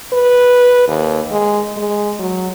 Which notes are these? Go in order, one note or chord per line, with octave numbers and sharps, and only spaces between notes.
B4
D#2
G#3
G#3
F#3